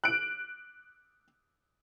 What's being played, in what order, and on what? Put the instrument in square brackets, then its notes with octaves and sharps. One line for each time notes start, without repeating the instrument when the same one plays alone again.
[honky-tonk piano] F#6 D7